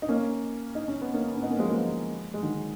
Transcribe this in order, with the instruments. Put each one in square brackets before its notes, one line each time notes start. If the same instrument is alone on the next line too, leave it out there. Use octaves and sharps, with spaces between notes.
[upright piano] D#4
A#3 C#4
D#4
C#4
B3
A#3 C#4
B3
C#4
B3 D#4
A#3 C#4
F3 G#3
F#3 A#3
F3 G#3
G#3
D#3 F#3